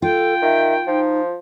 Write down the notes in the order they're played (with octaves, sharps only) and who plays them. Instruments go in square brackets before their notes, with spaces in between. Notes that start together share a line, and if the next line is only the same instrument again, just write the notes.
[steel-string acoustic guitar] F4 [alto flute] A4 [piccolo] G5
[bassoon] D#3 [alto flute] E5
[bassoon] F3 [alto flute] D#4